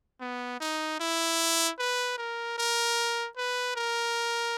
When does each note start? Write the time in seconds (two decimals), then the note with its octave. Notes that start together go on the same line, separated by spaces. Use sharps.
0.21 B3
0.60 D#4
1.00 E4
1.79 B4
2.18 A#4
2.58 A#4
3.37 B4
3.76 A#4